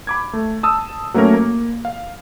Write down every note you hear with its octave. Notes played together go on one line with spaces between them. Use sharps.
B5 D6 G#6
A3
A5 D#6 E6
F#3 A3 A#3 C#4 A#4 C#5
A#3
F5